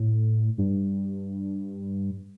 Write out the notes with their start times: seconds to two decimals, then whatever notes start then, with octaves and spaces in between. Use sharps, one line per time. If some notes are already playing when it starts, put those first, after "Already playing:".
Already playing: A2
0.58 G2